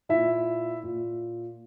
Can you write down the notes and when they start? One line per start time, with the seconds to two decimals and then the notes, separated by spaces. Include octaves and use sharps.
0.09 A#2 E4 E5
0.83 A#2